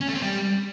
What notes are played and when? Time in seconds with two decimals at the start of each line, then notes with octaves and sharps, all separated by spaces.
0.01 C#4
0.08 A3
0.15 C4
0.22 G3